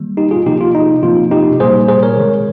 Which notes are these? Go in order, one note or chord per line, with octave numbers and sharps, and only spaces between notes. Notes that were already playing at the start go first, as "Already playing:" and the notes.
Already playing: D#3 G3 A#3
D#4 G4
F4 G#4
C3 F3 A#3 D#4 G4
F4
D#4
C3 F3 A#3 F4
D#4 G4
A#2 G3 A#3 G#4 C5
G#4 C5
A#4 C#5
C3 D#3 G#3